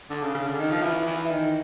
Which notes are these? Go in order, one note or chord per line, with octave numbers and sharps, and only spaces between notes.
D3
C#3
C#3
D3
D#3
F3
E3
E3
D#3